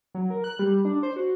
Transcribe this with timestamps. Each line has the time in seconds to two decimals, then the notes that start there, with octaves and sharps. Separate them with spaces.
0.15 F#3
0.30 A#4
0.44 F#6
0.59 G3
0.85 D4
1.03 C5
1.16 F#4